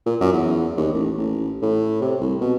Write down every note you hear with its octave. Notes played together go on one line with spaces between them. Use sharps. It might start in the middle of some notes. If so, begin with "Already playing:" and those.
A#2
F#2
E2
D#2
A1
A1
A2
C3
C2
B2